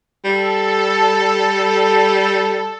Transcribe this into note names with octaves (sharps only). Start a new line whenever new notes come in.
G3 A4